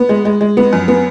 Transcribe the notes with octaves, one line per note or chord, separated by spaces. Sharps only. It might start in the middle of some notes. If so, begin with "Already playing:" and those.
Already playing: B3
G#3
G#3
G#3
B3
F#2
B3